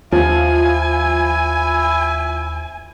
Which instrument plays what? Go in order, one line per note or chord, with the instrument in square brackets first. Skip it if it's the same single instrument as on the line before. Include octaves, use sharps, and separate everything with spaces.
[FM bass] D#2 [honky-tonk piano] F3 [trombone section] E4 [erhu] G#5